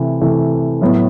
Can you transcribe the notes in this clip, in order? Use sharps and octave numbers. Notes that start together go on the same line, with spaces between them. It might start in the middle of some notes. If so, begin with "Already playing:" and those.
Already playing: C3 E3 A3
C3 E3 A3
A2 F#3 B3